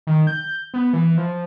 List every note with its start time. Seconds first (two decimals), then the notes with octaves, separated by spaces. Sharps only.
0.07 D#3
0.27 G6
0.74 B3
0.93 E3
1.17 F3